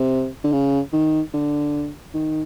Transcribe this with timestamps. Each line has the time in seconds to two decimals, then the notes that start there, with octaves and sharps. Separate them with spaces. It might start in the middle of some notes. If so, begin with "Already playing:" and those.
Already playing: C3
0.44 D3
0.52 C#3
0.93 D#3
1.34 D3
2.14 D#3